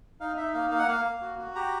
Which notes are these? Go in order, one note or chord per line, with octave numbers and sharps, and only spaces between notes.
D#4 F5
D#4 E5
A#3 F5
A#3 F5
F#5
A#3 F5
A#3
F#4
F#4
G4 A#5